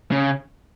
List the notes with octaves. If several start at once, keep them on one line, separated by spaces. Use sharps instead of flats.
C#3